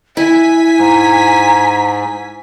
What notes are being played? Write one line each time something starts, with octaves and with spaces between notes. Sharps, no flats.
E4 E5 G#5 B6
G#2 A#5